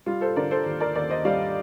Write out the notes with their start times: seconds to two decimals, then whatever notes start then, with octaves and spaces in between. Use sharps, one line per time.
0.06 G3 F4
0.21 A4 C5
0.36 D3 A#4 D5
0.51 A4 C5
0.66 D#2
0.80 A#4 D5
0.95 D#2 A#4 D5
1.10 C5 D#5
1.25 G3 D5 F5